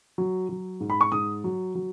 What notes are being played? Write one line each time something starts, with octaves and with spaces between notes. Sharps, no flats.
F#3
F#3
G#2
B5
C#6
G#2 D#6
F#3
F#3